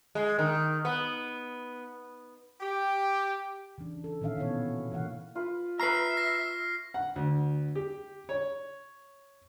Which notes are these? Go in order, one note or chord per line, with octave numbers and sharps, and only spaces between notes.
G#3
D#3
B3
G4
C#3 E3 D4
A4
A#2 D#3 C#4 E5 F5
B2 D#3 B3 E4 C#5
C3 E3 A#3 F5 F#5
F4 B4
B4 E5 A#5 C#6 F6 C7
A#6
F#5
D2
G4
C#5